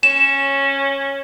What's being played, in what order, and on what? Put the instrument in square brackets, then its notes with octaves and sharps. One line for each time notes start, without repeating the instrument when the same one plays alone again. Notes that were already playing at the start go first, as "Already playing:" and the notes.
[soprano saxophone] C#4 [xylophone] E7